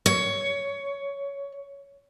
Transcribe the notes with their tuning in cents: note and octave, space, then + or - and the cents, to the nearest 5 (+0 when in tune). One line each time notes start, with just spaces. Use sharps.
C#5 +15